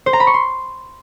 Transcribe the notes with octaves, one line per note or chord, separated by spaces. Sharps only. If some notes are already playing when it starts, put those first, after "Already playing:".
C5
A#5
B5
C#6
C6